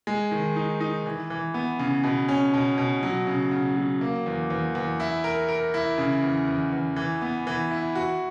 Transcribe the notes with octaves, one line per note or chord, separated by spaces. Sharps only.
G#3
D#3
D#4
D#4
E3
E3
B3
C#3
B2
C#4
B2
B2
F#3
C#3
C#3
F#3
A#3
E2
E2
E2
E4
A#4
A#4
E4
C#3
E2
E2
E2
E3
B3
E3
E4
F#4